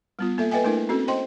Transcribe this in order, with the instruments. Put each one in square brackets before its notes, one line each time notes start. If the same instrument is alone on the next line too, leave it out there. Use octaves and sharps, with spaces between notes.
[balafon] G3 B3 F4
A#3 A4 E5
A4 B4 D#5 E5 G5 G#5
A3 D4 E4 A#4
C4 C#4 F#4 A4
C5 D#5 G5 C6